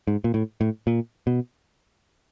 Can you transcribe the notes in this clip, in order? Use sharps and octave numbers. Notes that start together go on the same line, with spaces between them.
G#2
A#2
A2
A2
A#2
B2